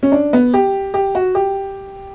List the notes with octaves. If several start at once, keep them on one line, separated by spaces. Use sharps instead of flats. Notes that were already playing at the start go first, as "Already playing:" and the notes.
C#4
D4
B3
G4
G4
F#4
G4